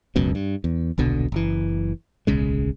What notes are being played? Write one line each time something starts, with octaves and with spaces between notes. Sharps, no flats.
E1 C#2 F#2 B2
G2
E2
D#1 B1 B2 D3
F#1 E3
D1 B1 C#3 G#3